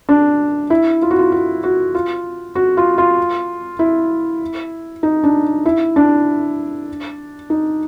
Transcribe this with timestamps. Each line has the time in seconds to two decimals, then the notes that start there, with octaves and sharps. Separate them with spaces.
0.09 D4
0.70 E4
1.02 F4
1.11 F#4
1.19 F4
1.32 F#4
1.64 F#4
1.95 F4
2.55 F#4
2.77 F4
2.98 F4
3.79 E4
5.03 D#4
5.24 D4
5.66 E4
5.96 D4
7.50 D#4